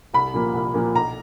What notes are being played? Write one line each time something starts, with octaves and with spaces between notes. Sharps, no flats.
C2 B5
A#2 F3 A#3
C2
A#2 F3 A#3
B1 A#5